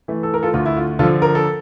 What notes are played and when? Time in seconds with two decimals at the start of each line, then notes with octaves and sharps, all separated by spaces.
0.08 E3 A3
0.23 A4
0.34 A#4
0.43 F4 A4
0.54 D2 F4
0.66 E4
0.77 F4
0.99 D3 F4 A4
1.03 F3
1.22 A#4
1.35 A4